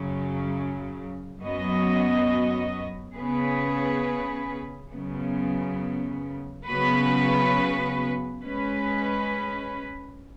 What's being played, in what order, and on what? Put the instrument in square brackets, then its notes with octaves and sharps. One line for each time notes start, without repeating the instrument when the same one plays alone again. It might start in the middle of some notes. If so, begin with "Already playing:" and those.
Already playing: [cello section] F#2 C#3 F#3
F#2 F#3 B3 F#4 D#5
C#3 B3 G#4 B4
F#2 C#3 B3
C#3 F#3 B3 F#4 B4
G#3 C#4 B4